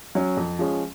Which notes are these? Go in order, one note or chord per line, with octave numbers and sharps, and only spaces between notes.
F#3 C#4
F2
F3 G#3 C#4